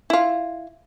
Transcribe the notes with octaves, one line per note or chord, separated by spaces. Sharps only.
E4 F4